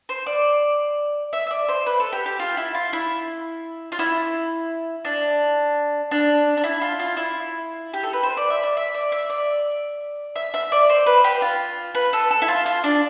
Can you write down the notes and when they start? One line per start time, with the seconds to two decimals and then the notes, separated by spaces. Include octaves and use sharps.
0.09 C5
0.26 D5
1.33 E5
1.47 E5
1.51 D5
1.68 C5
1.86 B4
2.00 A4
2.13 G4
2.26 G4
2.40 F4
2.57 E4
2.75 F4
2.93 E4
3.92 F4
3.99 E4
5.05 D4
6.11 D4
6.57 D4
6.64 E4
6.82 F4
7.00 F4
7.17 E4
7.94 G4
8.03 A4
8.13 B4
8.23 C5
8.37 D5
8.50 E5
8.63 D5
8.77 E5
8.94 D5
9.12 E5
9.30 D5
10.36 E5
10.54 E5
10.72 D5
10.90 C5
11.07 B4
11.24 G4
11.42 F4
11.95 B4
12.13 A4
12.31 A4
12.42 E4
12.48 F4
12.66 F4
12.84 D4